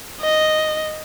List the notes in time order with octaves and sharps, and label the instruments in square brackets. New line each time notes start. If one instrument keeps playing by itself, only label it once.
[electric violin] D#5